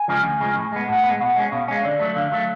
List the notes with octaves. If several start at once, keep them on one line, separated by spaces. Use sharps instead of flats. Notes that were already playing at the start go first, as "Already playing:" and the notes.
Already playing: G#5
C#3 F3 G#3
D2
C#3 F3 G#3
A2
G#3 B3
A2 F#5
B3
G#3
B2 F#5
G#3 C#4
B2 F5
G#3 C#4
D3 D5
F#3 A3
D3 F5
F#3 A3